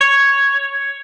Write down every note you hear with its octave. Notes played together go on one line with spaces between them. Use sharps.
C#5